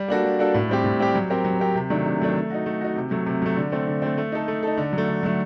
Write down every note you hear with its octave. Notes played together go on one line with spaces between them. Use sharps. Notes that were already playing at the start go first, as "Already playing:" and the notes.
Already playing: G3
A#3 D4 F#4 A4
G3
A#3 D4 F#4 A4
A2
G3 C4 G4
A2
G3 C4 G4
F#3
C4 G4 A#4
F#3
C4 G4 A#4
C3
D#3 F#3 A3 D4
C3
D#3 F#3 A3 D4
A3
D#4 F#4
A3
D#4 F#4
C3
F#3 A3
C3
F#3 A3
D3
A3 C4
D3
A3 C4
A3
D#4 A4
A3
D#4 A4
D3
F#3
A3
D3
F#3 A3